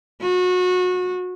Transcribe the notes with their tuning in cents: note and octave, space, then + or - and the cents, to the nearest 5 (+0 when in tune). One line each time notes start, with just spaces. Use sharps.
F#4 -30